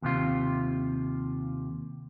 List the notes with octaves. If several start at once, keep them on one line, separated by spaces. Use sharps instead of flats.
D#2 C3 F4